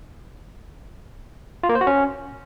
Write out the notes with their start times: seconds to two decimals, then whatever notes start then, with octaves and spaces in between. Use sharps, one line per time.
1.63 F4
1.69 A#3
1.75 C5
1.81 F#4
1.87 C#4